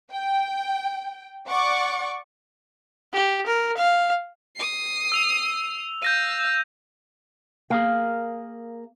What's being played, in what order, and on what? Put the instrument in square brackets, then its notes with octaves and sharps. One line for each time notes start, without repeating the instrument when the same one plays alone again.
[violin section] G5
D5 F#5 C#6 D6
[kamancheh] G4
A#4
F5
[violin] D#6 C7
[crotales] E6 F7
[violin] F5 E6 [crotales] G6 A#6 D#7
[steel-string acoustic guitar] A#3 [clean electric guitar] G#4 A#4 F5